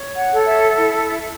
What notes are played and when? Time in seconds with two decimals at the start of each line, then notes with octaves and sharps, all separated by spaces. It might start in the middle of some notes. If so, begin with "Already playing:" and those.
Already playing: C#5
0.17 F#5
0.31 A4
0.47 E5
0.77 E4